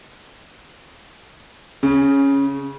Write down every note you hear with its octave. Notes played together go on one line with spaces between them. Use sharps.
C#3